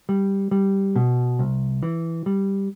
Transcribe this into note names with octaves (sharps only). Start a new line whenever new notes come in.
G3
G3
B2
C2
E3
G3